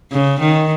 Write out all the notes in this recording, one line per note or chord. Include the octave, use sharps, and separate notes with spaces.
C#3
D#3